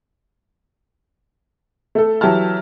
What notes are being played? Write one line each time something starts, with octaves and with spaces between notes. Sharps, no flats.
A3 A4
E3 F#3 G4 E5 A5 F6